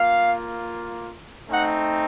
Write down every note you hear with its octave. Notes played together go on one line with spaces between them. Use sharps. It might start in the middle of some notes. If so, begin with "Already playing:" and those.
Already playing: A#3 F4 F5
A3 C4 D#4 F#5